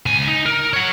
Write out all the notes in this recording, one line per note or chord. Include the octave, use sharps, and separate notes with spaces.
C#2 G#5
D#4
A#4
C#5 F#5